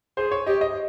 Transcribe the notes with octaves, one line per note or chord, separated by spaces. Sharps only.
G#4 C5
C#5
G4 D#5
D#5